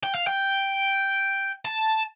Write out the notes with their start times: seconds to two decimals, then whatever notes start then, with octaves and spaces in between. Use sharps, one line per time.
0.03 G5
0.15 F5
0.27 G5
1.65 A5